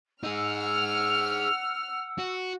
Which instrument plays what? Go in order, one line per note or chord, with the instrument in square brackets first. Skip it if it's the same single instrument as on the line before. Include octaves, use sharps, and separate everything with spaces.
[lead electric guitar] D#4 G#4 [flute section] F#5 E6 [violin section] F6
[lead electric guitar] F#4